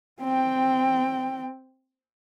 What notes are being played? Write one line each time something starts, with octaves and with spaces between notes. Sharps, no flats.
C4 G5